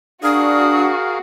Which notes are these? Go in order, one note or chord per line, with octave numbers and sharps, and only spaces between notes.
D4 F#4 G#4 A#4 F5 D#6